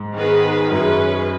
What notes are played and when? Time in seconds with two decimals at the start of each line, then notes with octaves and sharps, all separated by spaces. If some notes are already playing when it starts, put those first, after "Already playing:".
Already playing: G#2
0.15 D#3 B3 G#4 B4
0.70 F#2 C#4 G#4 B4